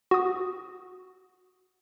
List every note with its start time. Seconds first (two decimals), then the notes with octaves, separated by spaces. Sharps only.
0.11 F#4 D#6